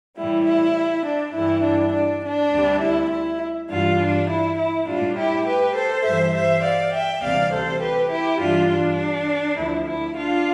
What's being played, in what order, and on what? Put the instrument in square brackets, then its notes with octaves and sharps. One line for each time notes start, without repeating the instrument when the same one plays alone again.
[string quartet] A2 E3 G3 E4
E4
D4
G2 E3 G3 E4
D4
D4
D4
D2 C3 G3
E4
E4
G2 E3 G3 D4 F4
D4
E4
E4
A2 G3 D4 F4
E4 G4
G4 B4
A4 C5
G2 E3 G3 C5 E5
C5 E5
D5 F5
E5 G5
D2 C3 E3 G3 D5 F5
A4 C5
G4 B4
E4 G4
G2 E3 G3 D4 F4
D4
D2 D3 F3 E4
E4
D4 F4